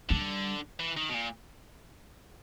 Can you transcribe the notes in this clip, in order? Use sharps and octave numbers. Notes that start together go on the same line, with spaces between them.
D3 G3
E3
D#3
B2
A#2